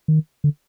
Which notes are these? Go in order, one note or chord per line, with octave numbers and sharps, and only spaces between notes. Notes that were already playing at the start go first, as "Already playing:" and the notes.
D#3
D3